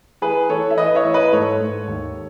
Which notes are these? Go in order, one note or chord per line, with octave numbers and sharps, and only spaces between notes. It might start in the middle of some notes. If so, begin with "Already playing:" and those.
E3 G#4 B4
E3 A4 C#5
E5
E3 B4 D#5
C#5 E5
E3
B4 D#5
G#2 A4 C#5
G#2
D#2